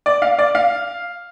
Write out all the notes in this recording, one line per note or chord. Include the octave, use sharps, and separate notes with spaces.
D5
F5
D5
F5